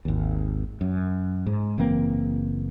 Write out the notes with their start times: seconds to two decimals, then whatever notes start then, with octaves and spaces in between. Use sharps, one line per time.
0.05 G#1 D#2
0.81 F#2
1.46 G#2
1.78 F#1 E3 A#3 C4